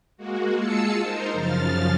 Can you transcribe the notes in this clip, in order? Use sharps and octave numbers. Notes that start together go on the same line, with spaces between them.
G#3 A#3 F#4
G#3 F4 G#4 A5 E6 C#7
D#4 A#4 C5
F#2 C#3 F3 F6 A6